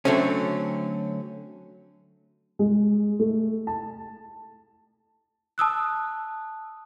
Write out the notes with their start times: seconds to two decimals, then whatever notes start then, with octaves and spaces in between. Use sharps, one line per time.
0.05 D3 F#3 A3 C4 C#4
2.59 G#3
3.19 A3
3.67 A5
5.58 A5 D#6 E6 F#6